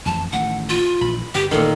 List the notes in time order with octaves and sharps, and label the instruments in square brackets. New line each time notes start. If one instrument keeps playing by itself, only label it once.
[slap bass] A1 F2 E3 [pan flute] A5
[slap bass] A1 D#3 A3 [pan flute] F#5
[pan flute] F4
[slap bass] A#1 E3 [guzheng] B5
[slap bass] G2 D3 [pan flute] G4 [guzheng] G5
[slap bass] A1 [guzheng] A#2 D#3 [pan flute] A4